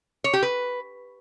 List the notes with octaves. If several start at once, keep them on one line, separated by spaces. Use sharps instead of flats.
C#5
G4
B4